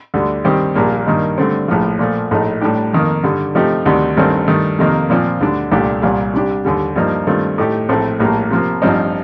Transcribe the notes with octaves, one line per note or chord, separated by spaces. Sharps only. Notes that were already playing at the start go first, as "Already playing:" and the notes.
D2 D3 G3
G2 D#3 G3 C4 G4
A#1 A#2 G3 A#3
G2 D#3 A#3 D#4
G2 D3 A3 C4
A#1 A2 F3
A#2 F3 A3
A#1 A2 A3 D#4
A2 G3 D4 G4
F2 D#3 A#3
G2 D3 G3
C3 F3 A3 D#4 G4
D2 C3 D#3 G3
A1 G2 D#3 A3 C4
G2 D#3 A3
F2 C3 D#3 A#3 D#4
A#2 F3 C4
D2 D3 G3 D4
C2 A#2 A3 D4 G4
C2 A#2 G3
C3 G3 D4 G4
D#2 D3 G3
G2 F3 A#3 D#4
G2 D#3 A3 C4 F4
A2 A3 D#4 G4
A#1 A2 A3 C4
A#1 A2 G3 A#3
C3 F3 A#3
A1 G2 F3 C4 D#4